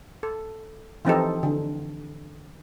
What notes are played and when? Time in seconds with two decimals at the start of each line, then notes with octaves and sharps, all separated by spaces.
0.23 A4
1.05 E3 F3 C4 D#4 G4 A4
1.43 D3